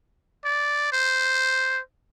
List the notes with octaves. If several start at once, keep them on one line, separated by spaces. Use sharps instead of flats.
D5
C5